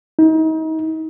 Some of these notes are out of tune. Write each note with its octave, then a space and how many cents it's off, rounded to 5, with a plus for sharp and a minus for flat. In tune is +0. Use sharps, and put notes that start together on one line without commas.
D#4 +35